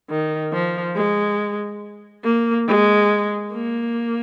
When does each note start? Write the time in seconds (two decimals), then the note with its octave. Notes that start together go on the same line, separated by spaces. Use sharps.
0.10 D#3
0.52 F3
0.95 G#3
2.24 A#3
2.67 G#3
3.52 A#3